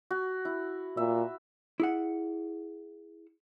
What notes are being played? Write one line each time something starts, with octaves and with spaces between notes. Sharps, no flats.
F#4
E4
A#2 E5
E4 G#4 F#5